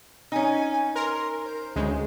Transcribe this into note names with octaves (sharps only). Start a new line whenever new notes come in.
C#4 D#4 G#5
A#4 C6
C5
D2 C#3 G#3